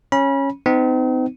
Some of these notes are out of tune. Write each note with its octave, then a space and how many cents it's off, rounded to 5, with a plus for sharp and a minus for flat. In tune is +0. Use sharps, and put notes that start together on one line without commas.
C#4 -10 B5 -35
C4 -40 D#4 +0